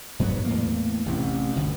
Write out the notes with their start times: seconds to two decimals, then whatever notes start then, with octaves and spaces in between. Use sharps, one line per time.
0.19 G2 F#3 B3
0.45 E2 A2 A#3
1.06 A1 C3 E3
1.56 G1 D2